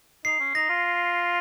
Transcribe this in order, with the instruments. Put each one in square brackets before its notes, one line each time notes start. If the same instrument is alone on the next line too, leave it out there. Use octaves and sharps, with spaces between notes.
[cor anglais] D#4 [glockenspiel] C7
[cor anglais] C#4
[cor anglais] D#4 [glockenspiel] A#6
[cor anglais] F4